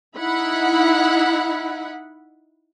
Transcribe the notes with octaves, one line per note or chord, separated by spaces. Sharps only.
D#4 E4 F#5 B5